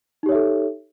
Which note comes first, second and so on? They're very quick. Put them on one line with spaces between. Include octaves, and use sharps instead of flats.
D#4 G4 C#5 E5 A4